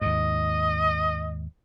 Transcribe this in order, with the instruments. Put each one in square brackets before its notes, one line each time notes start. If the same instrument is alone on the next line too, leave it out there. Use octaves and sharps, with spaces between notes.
[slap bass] D#2 G#2 [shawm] D#5